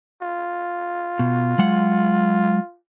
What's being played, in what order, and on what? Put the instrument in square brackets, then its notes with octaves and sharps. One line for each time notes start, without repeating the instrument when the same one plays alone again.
[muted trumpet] F4
[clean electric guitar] B2
F#3 G#3 F#5